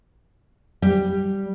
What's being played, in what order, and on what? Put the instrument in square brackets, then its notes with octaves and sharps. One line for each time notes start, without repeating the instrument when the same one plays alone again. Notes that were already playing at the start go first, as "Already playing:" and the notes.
[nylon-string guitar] G3